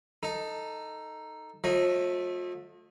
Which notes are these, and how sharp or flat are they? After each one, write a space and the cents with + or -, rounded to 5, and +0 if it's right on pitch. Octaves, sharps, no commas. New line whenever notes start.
D#4 +0 A4 +15
F3 +45 A3 +0 D#5 +0